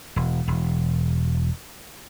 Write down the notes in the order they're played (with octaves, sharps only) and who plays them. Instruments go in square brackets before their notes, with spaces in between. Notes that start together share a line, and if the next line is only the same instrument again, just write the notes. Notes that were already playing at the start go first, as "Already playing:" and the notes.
[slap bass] E1
E1